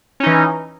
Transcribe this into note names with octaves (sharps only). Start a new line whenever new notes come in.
E3 C#4 D#4